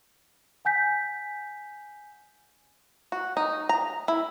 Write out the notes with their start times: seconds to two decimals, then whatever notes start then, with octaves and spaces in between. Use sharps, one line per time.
0.65 F#5 G#5 G6 B6
3.12 F#4
3.37 D#4
3.69 A#5
4.08 E4